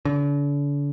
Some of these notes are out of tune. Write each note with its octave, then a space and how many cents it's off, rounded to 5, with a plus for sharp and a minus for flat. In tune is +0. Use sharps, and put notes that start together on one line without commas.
D3 -40